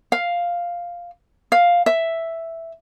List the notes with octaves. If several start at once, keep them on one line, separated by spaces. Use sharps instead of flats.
F5
F5
E5